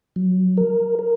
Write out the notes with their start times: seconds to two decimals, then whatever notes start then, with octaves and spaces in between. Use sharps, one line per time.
0.16 F#3
0.57 A#4
0.99 A#4